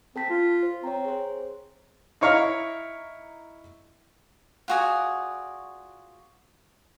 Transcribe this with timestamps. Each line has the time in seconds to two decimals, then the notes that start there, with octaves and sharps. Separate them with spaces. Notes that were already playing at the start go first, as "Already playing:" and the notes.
0.16 C4 A4 A5 B6
0.29 F4
0.63 C5
0.83 C4 C#5 A#5
1.05 G#4 C5
2.21 D#4 E4 C#5 F5 A#5
4.68 F4 F#4 G#4 D5